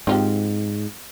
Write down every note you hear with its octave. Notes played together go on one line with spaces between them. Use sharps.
G#2 C4 F4 G4